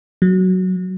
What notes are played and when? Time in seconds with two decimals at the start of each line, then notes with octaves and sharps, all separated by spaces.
0.22 F#3